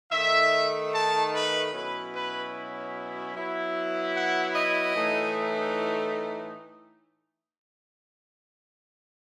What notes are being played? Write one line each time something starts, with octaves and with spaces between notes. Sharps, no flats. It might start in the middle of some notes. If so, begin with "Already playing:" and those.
D#3 A3 D#4 E5
A5
B4
B2 F#3 C#4 E4 B4
B4
F#3 B3 E4
F#5
D#5
A2 E3 A3 D#4